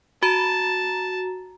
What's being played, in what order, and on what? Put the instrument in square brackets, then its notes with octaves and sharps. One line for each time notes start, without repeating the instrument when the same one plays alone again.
[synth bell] F#4 A#5 [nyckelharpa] A5